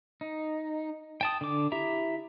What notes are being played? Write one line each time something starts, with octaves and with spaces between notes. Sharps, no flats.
D#4
G5 A5 D#6
D3 D6
E4 G4 E5 A#5